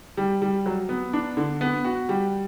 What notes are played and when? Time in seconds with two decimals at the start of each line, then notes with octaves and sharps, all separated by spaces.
0.17 G3
0.42 G3
0.66 F#3
0.89 B3
1.13 D4
1.37 D3
1.61 B3
1.84 F#4
2.09 G3